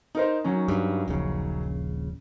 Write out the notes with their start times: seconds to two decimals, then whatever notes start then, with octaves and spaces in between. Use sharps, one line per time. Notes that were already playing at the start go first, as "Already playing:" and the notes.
0.15 D#4 A#4 C5
0.44 D#3 F#3 C#4
0.68 G2
1.08 D#1 A#1 C#3